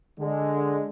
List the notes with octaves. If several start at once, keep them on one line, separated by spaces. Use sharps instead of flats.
D3 G#3